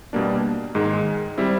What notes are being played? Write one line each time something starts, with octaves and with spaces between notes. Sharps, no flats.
B2 G3 A#3 D4
G#2 D#3 G#3
G3 C4 E4